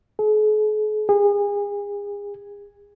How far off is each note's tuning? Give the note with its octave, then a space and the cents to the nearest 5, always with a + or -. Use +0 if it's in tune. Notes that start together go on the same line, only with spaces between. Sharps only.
G#4 +45
G#4 -35